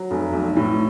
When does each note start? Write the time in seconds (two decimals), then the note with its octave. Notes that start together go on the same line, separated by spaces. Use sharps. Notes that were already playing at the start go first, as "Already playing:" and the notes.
Already playing: F#3
0.11 F1
0.33 B1
0.57 A2